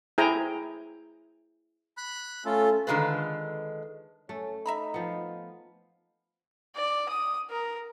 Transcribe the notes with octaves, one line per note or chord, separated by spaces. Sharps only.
E4 G#4 C5 G5 G#5 A#5
B5 F#6
A3 C#4 F4 A4
D3 D#3 G#3 F4 B4
A3 C#4
D#4 E5 A#5 B5
F3 B3
D5
D#6
A#4